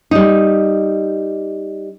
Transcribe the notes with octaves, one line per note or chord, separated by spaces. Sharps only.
G3 D#4